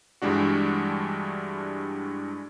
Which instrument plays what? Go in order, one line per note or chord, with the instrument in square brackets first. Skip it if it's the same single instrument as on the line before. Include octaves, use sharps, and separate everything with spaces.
[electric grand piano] G2 E3 G3 G#3 D4 F#4